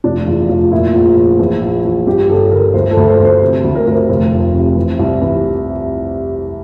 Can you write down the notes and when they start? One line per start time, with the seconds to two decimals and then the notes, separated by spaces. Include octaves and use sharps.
0.04 F1 D4
0.27 E2 F4
0.49 F1 F4
0.72 A#2 E4
0.94 A#1
1.17 A#1
1.39 E3
1.62 A#1
1.84 E3
2.07 G2 G4
2.29 G1 A4
2.51 G1 A#4
2.74 D2 C5
2.91 A4
2.97 D2
3.08 C5
3.19 D2
3.24 C5
3.41 C3
3.64 D2
3.75 A#4
3.87 D2 A#4
3.92 C5
4.09 F1
4.32 F2
4.54 C3
4.76 E3
4.99 C2
5.21 E3